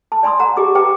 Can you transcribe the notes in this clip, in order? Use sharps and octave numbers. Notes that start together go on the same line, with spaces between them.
A5
D5 G#5 B5 C6 D#6
F#5 A#5
G4 G#4 D6
G4 B4 G5 A#5 D6